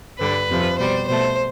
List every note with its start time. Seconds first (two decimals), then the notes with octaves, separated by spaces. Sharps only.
0.19 G2 D3 G3 B4
0.48 F2 C3 F3
0.78 B2 G3 C5
1.07 B2 A3 C5